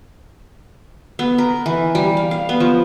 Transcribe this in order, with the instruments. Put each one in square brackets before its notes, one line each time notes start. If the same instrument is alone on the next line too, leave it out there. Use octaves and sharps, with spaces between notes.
[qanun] B3
A#4
E3
G3
F5
F5
B3
F3